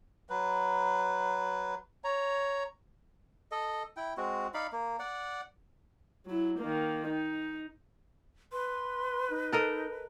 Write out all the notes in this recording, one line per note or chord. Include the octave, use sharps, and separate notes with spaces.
F#3 B4
C#5 A#5
A4 D#5
E4 G5
G#3 C4 F#4
D#4 D5 F5 B5
A#3
D5 F#5
F#3 E4
D#3 A#3
D#4
B4 C6
D#4
A4 A#4 D#5